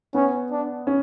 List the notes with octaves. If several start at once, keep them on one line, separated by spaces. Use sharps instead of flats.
B3 C#4
D4
C#4